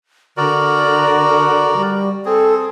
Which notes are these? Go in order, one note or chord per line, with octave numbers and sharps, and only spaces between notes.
D3 F#4 A#4 D5
G3
C4 G#4 A4